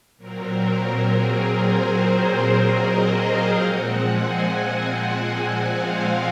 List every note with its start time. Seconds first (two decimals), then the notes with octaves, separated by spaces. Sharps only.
0.17 A#2 F#3 C4 A#4
0.59 A#4
1.02 G#4
1.45 C5
1.87 G#4
2.31 C5
2.74 D#5
3.16 F5
3.59 A#2 F3 G#3 C4 F#5
4.01 G#5
5.29 G#5
5.71 F5